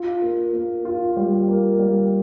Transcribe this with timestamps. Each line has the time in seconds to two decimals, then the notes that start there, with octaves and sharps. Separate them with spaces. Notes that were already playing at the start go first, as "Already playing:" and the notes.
Already playing: F4
0.22 A#3
0.53 A#3
0.85 F4
1.17 G3
1.48 A#3
1.79 G3